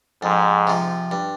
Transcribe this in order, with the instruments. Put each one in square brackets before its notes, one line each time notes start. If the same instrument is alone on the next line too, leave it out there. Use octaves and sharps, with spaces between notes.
[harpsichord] F2 [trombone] G#2
[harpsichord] C3 F3
G2